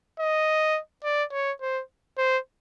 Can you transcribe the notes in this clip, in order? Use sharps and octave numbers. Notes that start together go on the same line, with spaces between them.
D#5
D5
C#5
C5
C5